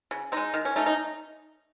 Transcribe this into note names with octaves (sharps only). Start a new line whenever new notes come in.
C#3
G#3 C4 D#4
D#3
C#4
A3 C#4 D#4
D#4